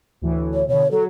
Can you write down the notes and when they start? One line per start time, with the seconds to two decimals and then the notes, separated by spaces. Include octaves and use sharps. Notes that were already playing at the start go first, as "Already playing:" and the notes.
0.22 D2 A2 E3
0.54 C#5
0.68 B2 D3 C#5
0.91 F#3 A4